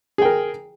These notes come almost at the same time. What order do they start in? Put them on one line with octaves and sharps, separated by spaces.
G#4 G5 A#4